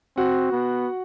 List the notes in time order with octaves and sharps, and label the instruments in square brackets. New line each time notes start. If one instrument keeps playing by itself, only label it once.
[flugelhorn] C4 [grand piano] F#4 F#5
[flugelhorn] B3